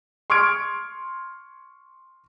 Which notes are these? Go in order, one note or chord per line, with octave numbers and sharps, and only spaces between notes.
C6 C#6 F6 G#6 D7